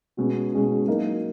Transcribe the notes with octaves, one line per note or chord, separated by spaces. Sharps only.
B2 G#3 C#4 F#4
B2 G#3 C#4 F#4
F#3 A#3 D#4